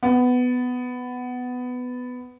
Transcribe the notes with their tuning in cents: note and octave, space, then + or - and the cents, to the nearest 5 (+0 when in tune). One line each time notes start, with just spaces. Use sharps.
B3 +10